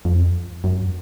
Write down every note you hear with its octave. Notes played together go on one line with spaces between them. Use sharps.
F2
F#2